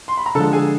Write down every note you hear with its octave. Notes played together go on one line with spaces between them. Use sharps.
C6
B5
A#5
D3 F3 G#3 A4 A5
G#4 G#5